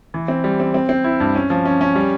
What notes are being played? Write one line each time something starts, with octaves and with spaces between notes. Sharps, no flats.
E3
C4
G3
C4
C4
C4
E4
G2
C#4
F3
C#4
C#4
G3